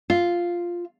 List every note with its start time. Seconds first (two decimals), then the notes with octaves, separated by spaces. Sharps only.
0.10 F4